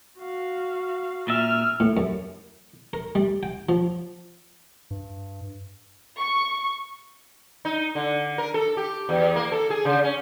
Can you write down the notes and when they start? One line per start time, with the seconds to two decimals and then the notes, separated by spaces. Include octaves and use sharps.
0.19 F#4 F5
1.28 A#2 E5 E6 F6
1.80 A2
1.97 F#2
2.93 A#4
3.15 G3
3.43 G5
3.69 F3
4.91 G2
6.20 C#6
7.65 D#4
7.95 D3
8.38 A#4
8.54 A4
8.77 G4
9.09 E2
9.36 A#3
9.52 A4
9.70 G#4
9.85 C#3
10.04 C#4